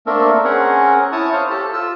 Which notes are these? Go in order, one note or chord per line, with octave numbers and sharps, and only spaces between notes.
A3 A#3 C4 D4 A4 A#4
C4 C#4 G#4 A#4 F#5
E4 C#5 A5 C#6 D#6
C5 C#5 F5
G4 A4 A5
F4 E6